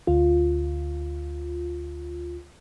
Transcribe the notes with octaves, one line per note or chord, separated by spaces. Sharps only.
D2 F4